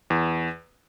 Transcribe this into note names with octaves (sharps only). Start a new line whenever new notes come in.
E2